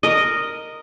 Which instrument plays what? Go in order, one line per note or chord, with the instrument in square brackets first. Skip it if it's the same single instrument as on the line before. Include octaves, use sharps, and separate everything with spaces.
[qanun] A#4 D#5